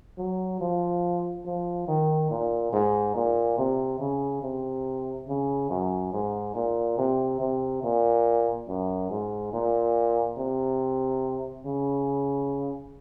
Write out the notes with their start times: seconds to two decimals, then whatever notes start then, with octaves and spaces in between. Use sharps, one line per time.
0.18 F#3
0.60 F3
1.46 F3
1.88 D#3
2.30 A#2
2.72 G#2
3.15 A#2
3.58 C3
4.00 C#3
4.43 C3
5.28 C#3
5.70 F#2
6.13 G#2
6.55 A#2
6.98 C3
7.40 C3
7.83 A#2
8.68 F#2
9.10 G#2
9.53 A#2
10.38 C3
11.66 C#3